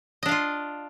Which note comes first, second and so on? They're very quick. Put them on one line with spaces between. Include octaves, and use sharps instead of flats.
D#5 D4 F5 F4